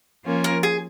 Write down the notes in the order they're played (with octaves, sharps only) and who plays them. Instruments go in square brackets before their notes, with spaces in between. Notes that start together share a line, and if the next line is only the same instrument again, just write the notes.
[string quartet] F3 A#3 C#4 F4
[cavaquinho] A#4
G#4